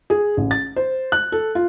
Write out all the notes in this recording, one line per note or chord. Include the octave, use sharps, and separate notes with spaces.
G#4
A1
A6
C5
F#6
A4
F4